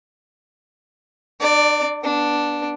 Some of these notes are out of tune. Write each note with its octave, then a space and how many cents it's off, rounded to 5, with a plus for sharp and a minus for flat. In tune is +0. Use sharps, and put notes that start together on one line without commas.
D4 +40 D5 +0
B3 -20 D4 +0